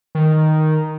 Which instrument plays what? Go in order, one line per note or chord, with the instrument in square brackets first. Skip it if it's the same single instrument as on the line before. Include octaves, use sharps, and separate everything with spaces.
[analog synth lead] D#3